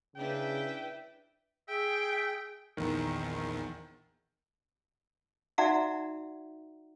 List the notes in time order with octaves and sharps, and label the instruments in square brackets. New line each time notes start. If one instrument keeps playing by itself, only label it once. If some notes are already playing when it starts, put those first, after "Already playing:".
[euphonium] C#3 [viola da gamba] D4 E4 B4 [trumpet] G5
[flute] G#4 [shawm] E5 [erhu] G5
[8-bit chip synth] A#1 E2 [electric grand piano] D#3
[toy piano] D#4 F#4 D5 E5 F#5 A#5